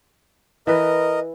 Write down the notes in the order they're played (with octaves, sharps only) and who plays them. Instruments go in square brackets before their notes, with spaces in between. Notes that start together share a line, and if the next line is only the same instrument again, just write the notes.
[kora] E3 B4 [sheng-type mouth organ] A#4 D#5